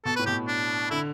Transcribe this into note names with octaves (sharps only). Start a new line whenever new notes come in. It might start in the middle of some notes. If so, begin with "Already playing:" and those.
B2 A4
A2 B4
B2 G4
D4
D3 E4